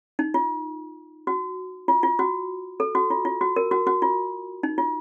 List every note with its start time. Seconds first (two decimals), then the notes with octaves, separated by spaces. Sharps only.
0.19 D#4
0.34 F4
1.27 F#4
1.88 F4
2.03 F4
2.19 F#4
2.80 A4
2.95 F#4
3.10 F4
3.25 F4
3.41 F#4
3.56 A#4
3.71 F#4
3.87 F#4
4.02 F4
4.63 D#4
4.78 F4